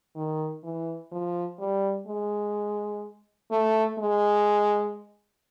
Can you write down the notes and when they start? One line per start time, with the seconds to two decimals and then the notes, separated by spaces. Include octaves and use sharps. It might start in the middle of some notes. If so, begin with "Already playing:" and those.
0.16 D#3
0.63 E3
1.12 F3
1.59 G3
2.07 G#3
3.51 A3
3.98 G#3